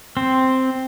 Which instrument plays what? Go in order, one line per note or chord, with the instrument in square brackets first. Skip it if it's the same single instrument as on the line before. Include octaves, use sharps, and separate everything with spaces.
[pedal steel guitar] C4